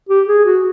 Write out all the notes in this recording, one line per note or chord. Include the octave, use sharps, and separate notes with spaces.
G4
G#4
F#4